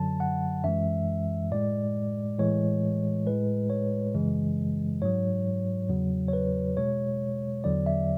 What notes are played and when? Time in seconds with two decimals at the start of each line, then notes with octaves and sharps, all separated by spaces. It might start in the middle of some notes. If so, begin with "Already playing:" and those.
Already playing: F#2 D3 F#3 A5
0.20 F#5
0.64 F#2 E3 G#3 E5
1.51 A2 G#3 D5
2.39 A2 E3 G#3 C#5
3.26 A2 G#3 B4
3.70 C#5
4.14 F#2 C#3 E3 G#3
5.02 G#2 F#3 C#5
5.89 E2 C#3 F#3
6.28 C#5
6.33 B4
6.77 B2 G#3 C#5
7.64 E2 D3 F#3 D5
7.86 E5